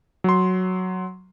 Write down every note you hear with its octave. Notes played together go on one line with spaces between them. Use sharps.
F#3 C6